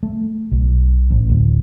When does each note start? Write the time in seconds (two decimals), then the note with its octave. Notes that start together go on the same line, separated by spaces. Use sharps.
0.03 A3
0.52 B1
1.11 A1
1.30 D1